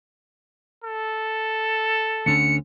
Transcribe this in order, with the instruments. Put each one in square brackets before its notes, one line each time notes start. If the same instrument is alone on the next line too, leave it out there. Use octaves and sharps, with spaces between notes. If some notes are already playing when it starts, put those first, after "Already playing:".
[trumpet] A4
[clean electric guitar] D2 D3 C#4 [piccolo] C#7